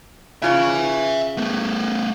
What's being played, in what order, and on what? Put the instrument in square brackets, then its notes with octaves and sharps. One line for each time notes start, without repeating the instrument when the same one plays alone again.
[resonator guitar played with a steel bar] C#3 F4 C#5 [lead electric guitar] E5 G#5
[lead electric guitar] A3 B3